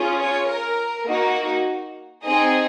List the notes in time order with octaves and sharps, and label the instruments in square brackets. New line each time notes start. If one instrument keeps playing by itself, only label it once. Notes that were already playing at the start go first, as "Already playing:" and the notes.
Already playing: [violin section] C#4 F4 G#4
C#5
A#4
A#3 D#4 F#4
C4 D#4 G#4 D#5